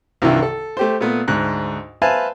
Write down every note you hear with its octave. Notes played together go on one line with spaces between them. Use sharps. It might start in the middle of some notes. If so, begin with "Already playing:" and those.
C2 G2 D#3 E3 E4 F4
A4
A3 G4 C5
A#2 A3 B3
D2 G#2 F#6
B4 C5 E5 F5 G#5 A5